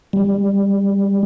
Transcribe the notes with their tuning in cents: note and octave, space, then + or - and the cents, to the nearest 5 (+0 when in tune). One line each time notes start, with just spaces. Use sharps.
G3 +20